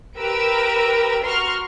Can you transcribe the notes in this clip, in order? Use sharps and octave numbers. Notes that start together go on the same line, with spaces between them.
G4 A#4 B4 E6 D7
F#4 A#5 C6 C#6 F6